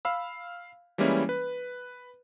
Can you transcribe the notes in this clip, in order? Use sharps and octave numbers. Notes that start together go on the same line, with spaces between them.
F5 B5 E6
E3 G3 G#3 A#3 C#4 E4
B4